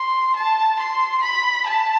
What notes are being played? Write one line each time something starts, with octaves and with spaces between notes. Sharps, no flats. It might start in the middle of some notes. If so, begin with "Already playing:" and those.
Already playing: C6
A5
C6
B5
A5